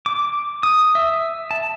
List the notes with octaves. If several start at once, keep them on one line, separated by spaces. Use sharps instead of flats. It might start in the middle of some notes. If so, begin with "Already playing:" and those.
D6
D#6
E5
A5